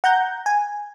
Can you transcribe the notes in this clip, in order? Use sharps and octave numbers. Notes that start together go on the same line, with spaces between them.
F#5 A#5 G6
G#5